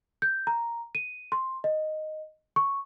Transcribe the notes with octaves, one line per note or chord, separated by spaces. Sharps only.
G6
A#5
D#7
C6
D#5
C#6